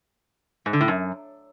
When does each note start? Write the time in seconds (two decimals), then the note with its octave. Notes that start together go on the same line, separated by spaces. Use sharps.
0.66 G#2
0.73 D3
0.81 A2
0.88 F#2